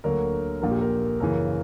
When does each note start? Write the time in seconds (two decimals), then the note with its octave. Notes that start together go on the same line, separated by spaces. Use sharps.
0.04 D2 D3 F#3 A#3 A#4
0.62 A#1 A#2 A#3 A#4
0.71 G4
0.81 A#4
1.20 F#2 C#3 E3 A#4